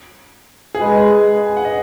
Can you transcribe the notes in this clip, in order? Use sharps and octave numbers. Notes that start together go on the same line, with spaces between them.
G#4
G#3 B4
G#5
F#5
D#5